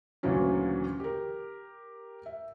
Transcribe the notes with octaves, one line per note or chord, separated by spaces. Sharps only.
D2 A#2 C#3 E3 F#3 C#4
G4 A#4
E5